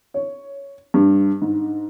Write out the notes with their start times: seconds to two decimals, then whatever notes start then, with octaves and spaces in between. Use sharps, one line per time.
0.14 C#5
0.94 G2
1.42 G#2